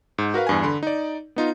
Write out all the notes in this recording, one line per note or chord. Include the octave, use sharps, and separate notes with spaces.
G#2
F#4 A#4 B4 F5
E2 G2 G#5
D3 B5 C6
D#4 D5
B3 D#4 F4